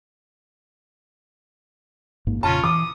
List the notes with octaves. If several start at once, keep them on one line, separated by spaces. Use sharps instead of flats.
A1 G#2 A#3
F2 A#2 C#3 C#4 F4 A5
E3 D6 D#6